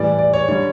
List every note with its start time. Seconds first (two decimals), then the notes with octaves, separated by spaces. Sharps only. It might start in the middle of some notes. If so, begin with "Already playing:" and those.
Already playing: A2 E3 G3 D5
0.19 D5
0.34 C#5
0.48 D3 G3 C#5